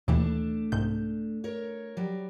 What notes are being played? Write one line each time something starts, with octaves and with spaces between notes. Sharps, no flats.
D#2 B2 E3 A3 D4
C2 G#2 G6
A#4 C#5
F#3 G3